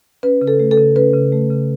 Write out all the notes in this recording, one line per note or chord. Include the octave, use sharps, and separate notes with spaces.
C#4 B4
C#3
A4
A3
A4
C#3
C#4 B4
C#3
A3
C#3